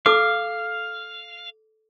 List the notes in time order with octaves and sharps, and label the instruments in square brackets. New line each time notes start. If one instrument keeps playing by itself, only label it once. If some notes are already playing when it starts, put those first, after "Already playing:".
[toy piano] A4 D6 [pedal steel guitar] F5